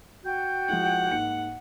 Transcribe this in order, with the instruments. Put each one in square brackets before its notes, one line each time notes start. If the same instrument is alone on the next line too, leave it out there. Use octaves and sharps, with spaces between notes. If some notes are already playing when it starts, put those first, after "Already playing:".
[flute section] F#4 G5 G6
[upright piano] F3 G#3 E4 [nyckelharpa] F#5
[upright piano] G#2 A#3 C#7